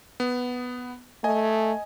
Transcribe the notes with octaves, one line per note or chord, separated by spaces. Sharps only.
B3
A3 D#5 G#5